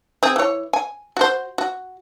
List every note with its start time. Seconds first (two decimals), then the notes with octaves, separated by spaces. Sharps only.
0.23 C4 G#4
0.36 E3 C#5
0.73 G#5
1.17 F#4 C5
1.58 F#4